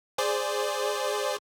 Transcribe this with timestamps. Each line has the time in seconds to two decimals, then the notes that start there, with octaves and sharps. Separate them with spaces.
0.18 G#4 C5 D5